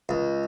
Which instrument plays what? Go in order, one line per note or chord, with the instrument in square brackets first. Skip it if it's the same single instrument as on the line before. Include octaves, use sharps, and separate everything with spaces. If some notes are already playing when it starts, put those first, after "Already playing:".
[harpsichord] C#2